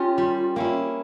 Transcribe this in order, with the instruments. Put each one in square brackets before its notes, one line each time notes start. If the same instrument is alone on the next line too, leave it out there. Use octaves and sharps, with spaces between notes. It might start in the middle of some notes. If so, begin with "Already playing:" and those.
Already playing: [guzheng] C#4 G4 A#4 [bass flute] F4
[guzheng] G3
A#3 C#4 E4